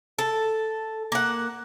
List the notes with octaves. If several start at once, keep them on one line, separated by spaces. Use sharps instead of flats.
A4
A#3 F#5